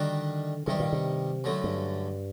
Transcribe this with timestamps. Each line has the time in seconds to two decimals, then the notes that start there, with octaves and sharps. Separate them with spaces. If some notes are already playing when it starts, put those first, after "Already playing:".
Already playing: D3 D#3 G3 D4 F#4
0.67 G2 C3 D#3 G3
0.80 A#2
0.92 C3
1.44 F#2 D3 F#3 A3
1.64 G2